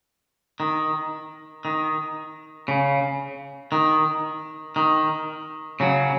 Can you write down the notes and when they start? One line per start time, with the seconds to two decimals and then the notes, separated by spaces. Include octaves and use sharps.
0.60 D#3
1.65 D#3
2.68 C#3
3.72 D#3
4.76 D#3
5.80 C#3 F#3